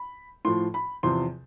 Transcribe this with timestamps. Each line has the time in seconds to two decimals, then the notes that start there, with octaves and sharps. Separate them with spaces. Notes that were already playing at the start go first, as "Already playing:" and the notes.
Already playing: B5
0.45 A2 F3 C6
0.74 B5
1.03 E2 C3 F3 C6